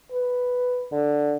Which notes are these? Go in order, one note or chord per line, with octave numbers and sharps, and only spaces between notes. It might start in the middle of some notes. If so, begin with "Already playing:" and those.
B4
D3